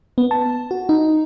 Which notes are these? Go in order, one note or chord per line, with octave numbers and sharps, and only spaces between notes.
B3
A5
F#4
D#4